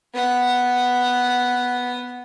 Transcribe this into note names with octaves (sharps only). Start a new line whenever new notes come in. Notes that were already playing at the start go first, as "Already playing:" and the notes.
B3 F#5